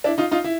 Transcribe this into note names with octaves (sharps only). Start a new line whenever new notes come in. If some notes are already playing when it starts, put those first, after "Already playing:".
D4 E4
D#4 F4
D#4 F4
E4